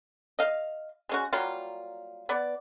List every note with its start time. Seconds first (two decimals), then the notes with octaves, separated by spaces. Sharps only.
0.39 D#5 F5
1.09 G#3 C#4 F#4
1.33 F#3 G3 A#3 F4
2.29 B3 D5